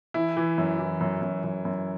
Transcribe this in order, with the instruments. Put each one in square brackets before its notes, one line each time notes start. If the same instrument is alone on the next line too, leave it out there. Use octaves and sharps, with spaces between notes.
[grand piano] E3 E4
E3
F#2
E3
F#2
F#2
F#2
F#2